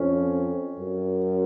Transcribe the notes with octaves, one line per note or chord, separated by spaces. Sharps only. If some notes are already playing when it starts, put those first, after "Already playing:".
Already playing: F2 C#4
F#2